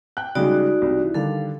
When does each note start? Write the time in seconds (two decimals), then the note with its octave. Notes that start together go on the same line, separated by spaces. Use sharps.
0.17 G5 F#6
0.35 C#3 G3 G#3 D#4 F#4 D5
0.82 C2
0.98 E3
1.14 D3 D#3 G3 A4 F5